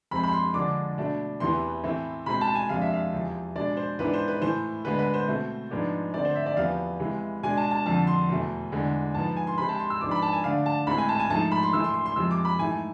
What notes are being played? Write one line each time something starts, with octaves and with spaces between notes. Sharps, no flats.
F2 C3 G#3 C4 B5
B5
C6
D3 F3 G#3 D4 D6
B2 A3 D4
E2 C3 E3 B3 C6
A2 E3 A3 C4
B2 G#3 C4 B5
A5
G#5
F2 C3 G#3 D4 F5
E5
F5
E2 C3 F3
B2 G#3 D4 D5
C5
G#2 E3 B3 D4 B4
C5
B4
A2 E3 A3 C5
D3 G#3 B3 B4
B4
C5
B2 A3 C4
G#2 F3 G#3 B3 D4
D3 A3 C4 D5
C5
E5
D5
E2 C3 F3 B3 F5
C3 E3 G#3 B3
B2 G#3 D4 G#5
A5
A5
F2 D3 F3 A5
C6
E2 B2 A3
E2 D3 G#3
G#2 F3 B3 A5
G#5
C6
C3 G#3 C4 B5
A5
C6
E6
G#2 F3 B3 D4 D6
B5
A5
G#5
D3 A3 D4 F5
A5
A2 G#3 C4 B5
G#5
A5
G#5
G#2 F3 A3 A5
B5
C6
A2 E3 A3 E6
C6
C6
C6
F2 C3 F3 G#3 E6
D6
B5
G#2 E3 A3 G#5